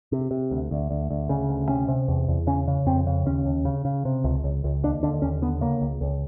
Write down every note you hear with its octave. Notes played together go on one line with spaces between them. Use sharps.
C3
C3
D2
D2
D2
D2
C#3
D2
C3 C#4
C3
E2
E2
C#3 C#4
C#3
F2 C4
C#3
D#2 C#4
D#2
C#3
C#3
C3
C#2
C#2
C#2
D#2 D4
D3 D4
D#2 C#4
D3 B3
C#3 A#3
C#2
C#2